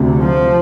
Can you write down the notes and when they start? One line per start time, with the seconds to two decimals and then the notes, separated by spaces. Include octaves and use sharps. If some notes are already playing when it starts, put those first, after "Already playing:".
Already playing: D2 C3
0.20 F3